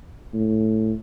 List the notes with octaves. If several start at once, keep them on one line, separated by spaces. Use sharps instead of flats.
A2